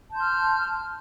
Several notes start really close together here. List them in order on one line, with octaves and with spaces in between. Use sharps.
A5 G6 C6 F6